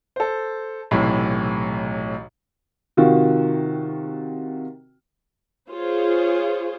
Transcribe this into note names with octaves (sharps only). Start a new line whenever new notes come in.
A4 C5
B1 A2 C3 E3
C3 D#3 F4 F#4
F4 G#4 C5 C#5